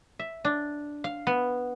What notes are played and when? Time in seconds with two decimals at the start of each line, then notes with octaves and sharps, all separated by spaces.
0.19 E5
0.45 D4
1.04 F5
1.27 B3